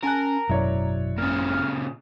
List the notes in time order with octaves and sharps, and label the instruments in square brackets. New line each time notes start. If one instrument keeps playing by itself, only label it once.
[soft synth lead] C#4 [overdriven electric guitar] A#4 [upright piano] G#5 A5 F#6
[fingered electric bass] G#1 F#2 [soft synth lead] B2 [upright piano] E4 C#5 D5
[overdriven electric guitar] A#2 C#3 [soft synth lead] F6